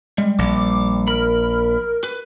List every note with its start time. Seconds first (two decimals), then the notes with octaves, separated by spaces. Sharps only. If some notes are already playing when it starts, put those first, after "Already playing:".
0.18 G3 G#3
0.39 A#1 D6
1.08 A#4 B5
2.04 B4